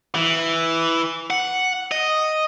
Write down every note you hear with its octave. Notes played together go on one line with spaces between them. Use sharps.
E3
F#5
D#5